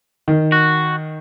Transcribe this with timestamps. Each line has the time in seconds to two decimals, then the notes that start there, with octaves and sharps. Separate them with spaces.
0.28 D#3
0.52 F#4